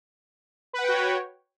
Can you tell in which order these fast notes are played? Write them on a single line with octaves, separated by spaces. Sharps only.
B4 F#5 G5 F#4 C#5